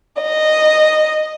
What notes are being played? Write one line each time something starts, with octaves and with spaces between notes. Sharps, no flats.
D#5